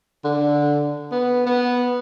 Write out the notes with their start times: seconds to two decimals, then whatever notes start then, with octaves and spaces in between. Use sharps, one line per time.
0.24 D3
1.11 B3
1.46 B3